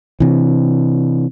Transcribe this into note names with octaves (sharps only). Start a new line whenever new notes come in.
C3 E3